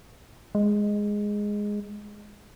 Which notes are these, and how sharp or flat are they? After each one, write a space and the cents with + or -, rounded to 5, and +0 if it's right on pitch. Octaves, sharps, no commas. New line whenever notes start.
G#3 -5